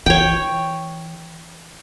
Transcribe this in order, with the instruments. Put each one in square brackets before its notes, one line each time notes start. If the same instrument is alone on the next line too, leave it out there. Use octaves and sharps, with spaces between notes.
[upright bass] E3 [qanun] C#5 G5